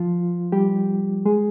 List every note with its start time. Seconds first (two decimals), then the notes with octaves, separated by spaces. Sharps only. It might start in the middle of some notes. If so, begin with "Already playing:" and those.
Already playing: F3 F4
0.52 G3 G4
1.25 G#3 G#4